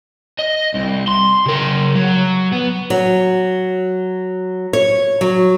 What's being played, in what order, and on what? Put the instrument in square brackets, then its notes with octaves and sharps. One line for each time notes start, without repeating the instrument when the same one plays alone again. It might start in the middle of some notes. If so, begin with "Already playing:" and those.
[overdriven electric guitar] D#5
C2
C6
C#3 A#4
F#3
B3
[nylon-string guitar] F#3
C#5
F#3